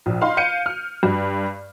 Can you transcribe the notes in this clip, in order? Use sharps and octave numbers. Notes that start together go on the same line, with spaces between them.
A#1
D#4 F5 B5 C6
F5 G6 C#7 D#7
F6
G2